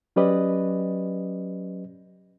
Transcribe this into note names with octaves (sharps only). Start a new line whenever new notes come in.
F#3 C#4 G4 B4 D5 D#5